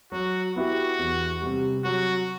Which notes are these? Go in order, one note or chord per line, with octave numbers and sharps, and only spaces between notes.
F#3 F#4
B3 E4 F#4 G4
E2
C3 G3
F#3 F#4